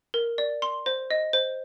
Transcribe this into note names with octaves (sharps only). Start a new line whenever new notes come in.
A#4
D5
C6
C5
D#5
C5